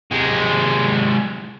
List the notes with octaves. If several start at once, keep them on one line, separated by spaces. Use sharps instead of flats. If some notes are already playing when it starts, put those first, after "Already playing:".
C3 G#3